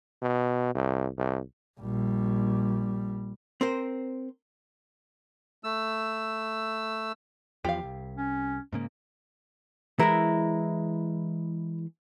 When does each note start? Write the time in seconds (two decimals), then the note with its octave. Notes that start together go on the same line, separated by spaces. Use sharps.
0.22 B2
0.75 C2
1.18 C2
1.80 A#1 G3
3.61 C4 A#4 C5
5.64 A3 E6
7.65 E2 F3 G4 F5
7.83 C2
8.17 C#4
8.73 G#2 C#3 A#3
9.99 E3 G#3 E4 A#4